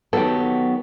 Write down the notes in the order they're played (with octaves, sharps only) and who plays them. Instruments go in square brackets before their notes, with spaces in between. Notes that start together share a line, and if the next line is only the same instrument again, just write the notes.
[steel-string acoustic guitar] D#3 F#3 B3 [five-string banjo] G4 A4